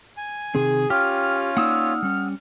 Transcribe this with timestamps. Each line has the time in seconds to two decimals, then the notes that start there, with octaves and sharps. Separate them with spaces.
0.17 G#5
0.55 C3 D#3 C4 G#4
0.90 C#4 F4 G4 G5 F6
1.57 A#3 D#4 D5 F#5 D#6 E6
2.03 G3 C#4